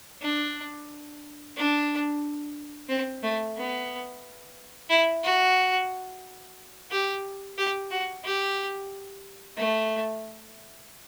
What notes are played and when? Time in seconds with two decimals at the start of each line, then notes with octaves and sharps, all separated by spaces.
0.22 D4
1.56 D4
2.89 C4
3.23 A3
3.57 B3
4.90 E4
5.24 F#4
6.91 G4
7.58 G4
7.91 F#4
8.25 G4
9.58 A3